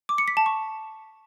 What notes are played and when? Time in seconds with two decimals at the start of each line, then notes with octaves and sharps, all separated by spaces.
0.09 D6
0.18 C#7
0.28 B6
0.37 A5
0.46 C#6